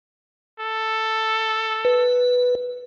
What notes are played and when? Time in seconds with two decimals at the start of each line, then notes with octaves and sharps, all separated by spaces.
0.60 A4
1.85 B4